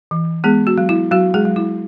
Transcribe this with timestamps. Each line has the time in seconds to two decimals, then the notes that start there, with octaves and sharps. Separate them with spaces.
0.11 E3
0.44 G#3 B3 G#4
0.67 F#4
0.78 F#3
0.89 E4
1.11 F#3 F#4
1.34 G#3 G#4
1.45 F#3
1.56 E4